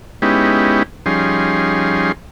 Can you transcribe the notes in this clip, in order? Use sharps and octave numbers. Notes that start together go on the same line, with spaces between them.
G#3 B3 C#4 D#4 E4 G4
F3 G3 C#4 D#4 G#4 C6